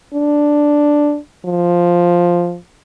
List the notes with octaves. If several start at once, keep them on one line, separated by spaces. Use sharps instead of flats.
D4
F3